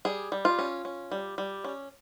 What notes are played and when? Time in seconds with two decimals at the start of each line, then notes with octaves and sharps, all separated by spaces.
0.05 G3 G#4
0.32 G3
0.45 F4
0.59 C#4
0.85 C#4
1.12 G3
1.38 G3
1.64 C#4